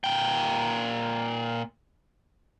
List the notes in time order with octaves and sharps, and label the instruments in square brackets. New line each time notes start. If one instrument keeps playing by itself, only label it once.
[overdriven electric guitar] A#2 G5